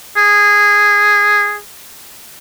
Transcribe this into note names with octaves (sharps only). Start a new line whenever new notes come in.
G#4